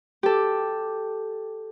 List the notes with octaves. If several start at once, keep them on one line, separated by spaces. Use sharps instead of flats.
G4 A4